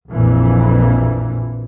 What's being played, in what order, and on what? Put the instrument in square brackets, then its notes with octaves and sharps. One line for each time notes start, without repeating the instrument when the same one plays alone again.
[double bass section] A#1 F2 A#2 E3